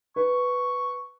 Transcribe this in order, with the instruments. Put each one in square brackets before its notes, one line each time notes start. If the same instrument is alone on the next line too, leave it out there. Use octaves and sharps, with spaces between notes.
[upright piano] B4 [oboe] C#6